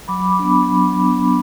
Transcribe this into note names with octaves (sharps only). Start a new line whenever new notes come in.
F#3 B5 D6
B5 D6
B3 D4
B5 D6
F#3
B3 D4